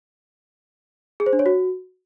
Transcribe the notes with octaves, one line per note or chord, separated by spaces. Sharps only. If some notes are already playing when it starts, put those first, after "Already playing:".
G#4
C5
D4
C#5
F#4